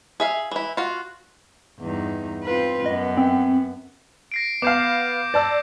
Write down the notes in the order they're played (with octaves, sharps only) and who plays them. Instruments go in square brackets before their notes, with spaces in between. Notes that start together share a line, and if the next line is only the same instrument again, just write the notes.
[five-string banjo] G#4 E5 F5
E3 E4
F4 F#4
[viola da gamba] E2 G2 D#4
C4 F4 B4
[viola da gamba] F#2 B3 [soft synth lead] D#5
[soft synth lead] C4
[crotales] A#6 C7 D7
[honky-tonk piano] B3 F5 [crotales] D6 G6 C7
[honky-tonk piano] D5 A5 E6